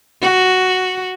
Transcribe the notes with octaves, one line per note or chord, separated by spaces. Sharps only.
F#4